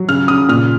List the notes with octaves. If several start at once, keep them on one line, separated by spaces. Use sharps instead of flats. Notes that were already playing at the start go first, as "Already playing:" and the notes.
Already playing: F#3
C#3 F6
C#3 D#6
A#2 F6